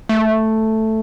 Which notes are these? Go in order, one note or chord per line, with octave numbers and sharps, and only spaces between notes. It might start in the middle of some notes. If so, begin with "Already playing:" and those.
A3